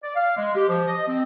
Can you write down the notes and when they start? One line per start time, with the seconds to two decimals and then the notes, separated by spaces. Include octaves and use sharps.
0.03 D5
0.16 F5
0.37 G#3
0.55 G4
0.68 F3
0.87 D#5
1.08 C4